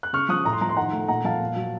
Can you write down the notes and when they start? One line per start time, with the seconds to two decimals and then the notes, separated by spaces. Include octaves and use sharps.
0.03 F#6
0.13 C#3 C#6 F6
0.29 F3 D#6 F#6
0.45 A2 A#5
0.53 C6
0.61 F3 A#5
0.69 C6
0.76 D#3 F#5 A#5
0.92 A3
1.08 A#2 F#5 A#5
1.24 F3 F5 A5
1.40 A#2
1.56 F#3